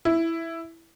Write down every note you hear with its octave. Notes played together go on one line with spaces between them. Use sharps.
E4